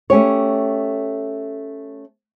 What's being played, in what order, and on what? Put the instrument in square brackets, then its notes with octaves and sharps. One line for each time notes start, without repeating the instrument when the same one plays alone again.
[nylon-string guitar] A3 C#4 G4 C#5